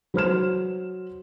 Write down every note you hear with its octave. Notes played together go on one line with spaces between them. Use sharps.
F#3 C5 F6 E7